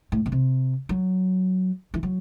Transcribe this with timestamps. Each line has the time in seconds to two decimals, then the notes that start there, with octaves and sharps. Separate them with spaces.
0.12 A2
0.26 B2
0.32 C3
0.89 F#3
1.94 E3
2.03 F#3